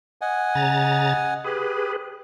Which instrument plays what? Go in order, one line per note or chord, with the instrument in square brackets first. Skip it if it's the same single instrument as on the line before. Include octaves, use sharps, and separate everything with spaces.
[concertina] D#5 F#5 G#5
[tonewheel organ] C#3 A#5 A6
[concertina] G4 [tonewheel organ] G#4 B4